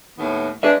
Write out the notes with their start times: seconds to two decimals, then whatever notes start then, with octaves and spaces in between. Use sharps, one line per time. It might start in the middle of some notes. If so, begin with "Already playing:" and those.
0.17 D#2 A2 B3
0.63 G#3 D4 G#4 B4 E5